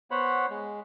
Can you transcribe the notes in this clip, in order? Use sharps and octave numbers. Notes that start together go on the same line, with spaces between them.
B3 C5 C#5 F#5 B5
G#3